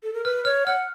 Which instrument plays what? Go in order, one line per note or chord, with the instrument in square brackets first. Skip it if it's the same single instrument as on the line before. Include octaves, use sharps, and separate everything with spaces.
[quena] A4
A#4
[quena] B4 [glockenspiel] F6
[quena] C#5 [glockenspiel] F6
[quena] F#5 [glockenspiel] F6